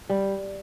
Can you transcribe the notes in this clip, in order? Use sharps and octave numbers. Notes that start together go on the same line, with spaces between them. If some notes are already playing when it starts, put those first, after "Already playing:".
G3